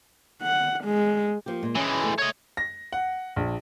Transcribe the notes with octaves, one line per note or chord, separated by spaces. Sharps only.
F#5
G#3
F3 A#3 G4
A#2 G#3
E3 G#3 C#4
A3
C#5 D#5
A#6
F#5
A#1